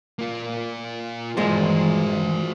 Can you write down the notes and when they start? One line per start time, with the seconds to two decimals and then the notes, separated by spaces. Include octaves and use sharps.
0.19 A#3 F4
1.37 G2 A#2 D#3 E3 G#3 F#4 C5